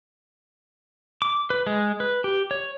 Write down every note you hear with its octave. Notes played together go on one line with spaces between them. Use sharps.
D6
B4
G#3
B4
G4
C#5